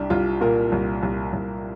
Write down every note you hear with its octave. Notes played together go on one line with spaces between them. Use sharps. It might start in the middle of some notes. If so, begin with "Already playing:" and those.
Already playing: C2 D4 G4
C2 F4
A#2 F4 A#4
C2
C2
C2